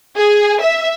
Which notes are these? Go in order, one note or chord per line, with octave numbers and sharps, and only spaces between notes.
G#4
E5